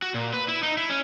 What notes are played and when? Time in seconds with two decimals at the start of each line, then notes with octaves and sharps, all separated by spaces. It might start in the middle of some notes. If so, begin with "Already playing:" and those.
0.02 F#4
0.14 A#2
0.33 B4
0.48 E4
0.63 D#4
0.78 E4
0.89 C#4